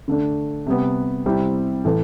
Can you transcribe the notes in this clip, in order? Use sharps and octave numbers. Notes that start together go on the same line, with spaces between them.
D3 A3 D4
C3 G3 B3
C3 G3 C4 E4
A2 E3 A3